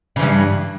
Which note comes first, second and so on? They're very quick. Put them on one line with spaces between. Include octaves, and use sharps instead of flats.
C#3 E3 G2